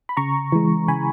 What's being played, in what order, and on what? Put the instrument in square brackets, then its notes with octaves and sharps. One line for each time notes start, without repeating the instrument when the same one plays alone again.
[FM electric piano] B5
C#3 A#5 C#6
E3 G#3
C#3 G#5 B5